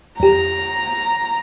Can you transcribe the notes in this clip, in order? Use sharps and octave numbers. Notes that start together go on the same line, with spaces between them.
F2 G4 A#5